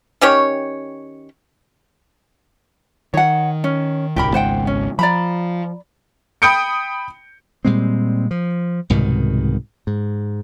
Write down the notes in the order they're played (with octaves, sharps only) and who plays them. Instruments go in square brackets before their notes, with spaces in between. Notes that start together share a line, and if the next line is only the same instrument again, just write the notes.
[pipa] D#3 C#4 G4 C#5
[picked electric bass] D#3 [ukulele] C#5 F#5
[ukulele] C#4
[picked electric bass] D1 C2 [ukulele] G4 A#4 B5
[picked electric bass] G#1 C#2 G#2 [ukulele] C5 F#5 G5
[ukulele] C#4
[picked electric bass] F3 [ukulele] D5 A#5 B5
[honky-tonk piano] G5 B5 D#6 G6 C#7 D7
[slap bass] A#2 G3 G#3 C4
F3
C2 G#2 B2 D#3
G#2